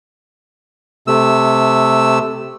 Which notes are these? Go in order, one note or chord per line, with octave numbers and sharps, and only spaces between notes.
C3 A3 E6